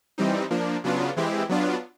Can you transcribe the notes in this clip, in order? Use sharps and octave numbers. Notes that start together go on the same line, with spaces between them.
E3 G3 C4 D#4
F3 A#3 D4
C#3 F#3 B3 D4 F4
E3 G#3 C4 E4 G4
F#3 B3 D4 F4